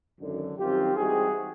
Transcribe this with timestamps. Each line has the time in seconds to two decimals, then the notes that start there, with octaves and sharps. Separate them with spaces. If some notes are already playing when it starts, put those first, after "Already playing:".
0.20 G#1 F#2 D3
0.58 F#2 D#3 G3 C4 F4 G4
0.97 G#2 E3 G3 C4 F#4 G#4